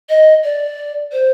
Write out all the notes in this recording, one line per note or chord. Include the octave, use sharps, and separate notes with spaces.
D#5
D5
C5